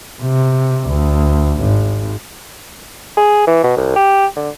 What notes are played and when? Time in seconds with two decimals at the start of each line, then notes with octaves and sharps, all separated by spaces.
0.21 C3
0.87 D2
1.60 G#1
3.17 G#4
3.47 E3
3.64 B2
3.77 C2
3.96 G4
4.36 D3